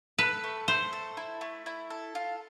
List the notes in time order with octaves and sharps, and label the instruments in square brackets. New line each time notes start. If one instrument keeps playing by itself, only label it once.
[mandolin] A4 [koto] B4
[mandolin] A3
[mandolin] A3 [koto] C5
[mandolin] A4
E4
A3
E4
A4
F4